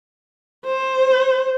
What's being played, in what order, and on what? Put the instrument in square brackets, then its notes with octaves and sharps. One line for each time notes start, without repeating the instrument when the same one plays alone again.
[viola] C5